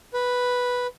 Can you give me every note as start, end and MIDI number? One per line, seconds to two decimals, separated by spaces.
0.14 0.87 71